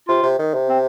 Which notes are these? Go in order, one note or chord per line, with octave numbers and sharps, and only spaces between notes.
C3 F4
C3
D#3
C3
C4